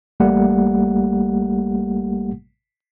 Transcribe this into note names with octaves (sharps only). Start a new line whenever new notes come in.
A1 G3 A3 A#3 G4 F#5